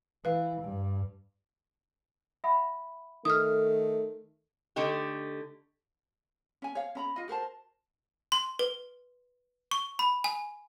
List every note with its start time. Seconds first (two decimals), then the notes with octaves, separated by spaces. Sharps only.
0.25 E3 B4 F5
0.61 G2
2.44 E5 F#5 B5
3.25 D#3 A3 D#6 F6
4.76 D3 A3 D#4 G4
6.62 C#4 G#5
6.75 C#5 F5
6.95 C#4 A#5 B5
7.16 F4 D#5
7.28 F#4 A#4 C5 A5
8.32 C6
8.59 B4
9.71 C#6
9.99 B5
10.24 G#5